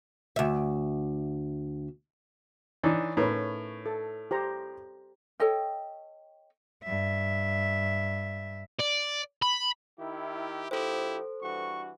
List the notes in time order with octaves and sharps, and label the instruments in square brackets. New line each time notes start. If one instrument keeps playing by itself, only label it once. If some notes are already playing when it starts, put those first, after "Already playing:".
[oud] D2 E5
[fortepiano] E3 D4 D#4 [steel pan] C#5 C#6
[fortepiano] A2 C#4 [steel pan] D#4 A#4 B4
[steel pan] A4
G4 C5 A#5
[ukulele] A4 C#5 D#5 G5
[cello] G2 E5
[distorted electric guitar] D5
B5
[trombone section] D#3 E4 [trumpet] G4
[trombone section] A#1 F3 G4 [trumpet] E4 [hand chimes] A4 C5
[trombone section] G2 E3 F#4 [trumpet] C#6